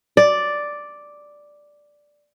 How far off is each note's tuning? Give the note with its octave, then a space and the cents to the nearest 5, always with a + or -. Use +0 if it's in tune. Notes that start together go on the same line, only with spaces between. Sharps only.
D5 +0